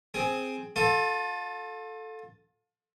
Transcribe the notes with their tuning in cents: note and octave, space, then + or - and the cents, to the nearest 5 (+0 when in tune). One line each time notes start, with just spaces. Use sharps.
C4 +0 G#4 +10
F4 +35 A4 +0